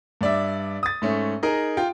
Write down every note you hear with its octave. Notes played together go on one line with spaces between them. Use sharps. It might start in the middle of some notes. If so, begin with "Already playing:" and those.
G2 D5 E5
D#6 A6
G#2 A3 C#4
D#4 G#4 A#4
F4 G5